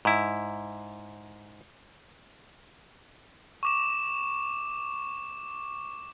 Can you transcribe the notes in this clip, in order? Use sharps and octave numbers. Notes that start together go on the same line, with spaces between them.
G#2 E4
C#6 D6 E7